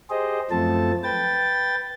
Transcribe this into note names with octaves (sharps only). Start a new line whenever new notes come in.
G4 G#4 C5 D#5
F#2 F3 A3 C4 A4 A5
B4 G5 A6